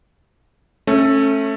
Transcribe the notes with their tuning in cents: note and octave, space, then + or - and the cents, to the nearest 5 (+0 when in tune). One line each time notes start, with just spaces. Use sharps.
A3 +0 C#4 -25